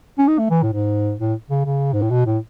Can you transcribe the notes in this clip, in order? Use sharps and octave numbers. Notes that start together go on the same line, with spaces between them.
C#4
D#4
A3
E3
A2
G#2
A2
C#3
C#3
G#2
A2
B2
A2